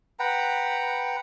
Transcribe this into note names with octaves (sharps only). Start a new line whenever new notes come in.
B4 F#5 G5 A#5